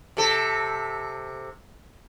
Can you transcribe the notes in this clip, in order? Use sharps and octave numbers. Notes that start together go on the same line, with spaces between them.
C3 A4